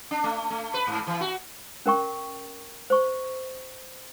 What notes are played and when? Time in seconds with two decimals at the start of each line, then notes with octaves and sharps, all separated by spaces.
0.11 D4
0.24 A3
0.50 A3
0.74 B4
0.87 G#2
1.07 E3
1.21 F#4
1.86 C#4 A#4 G5 C#6
2.90 C5 C#6